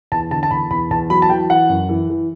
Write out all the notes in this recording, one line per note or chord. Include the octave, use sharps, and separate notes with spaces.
E2 A5
D3 A5
A5
E2 B5
E2 B5
E2 A5
F#3 B5
A5
E3 G5
E3 F#5
F#2
E3
E3